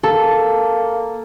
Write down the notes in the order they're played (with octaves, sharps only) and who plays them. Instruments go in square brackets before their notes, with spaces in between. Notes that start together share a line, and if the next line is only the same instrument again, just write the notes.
[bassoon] A#3 [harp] A4